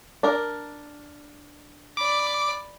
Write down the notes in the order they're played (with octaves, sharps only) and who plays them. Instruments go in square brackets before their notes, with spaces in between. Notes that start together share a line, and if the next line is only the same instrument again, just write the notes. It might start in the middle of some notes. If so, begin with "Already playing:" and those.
[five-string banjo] D4 A#4
[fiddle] D5 B5 [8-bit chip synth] D6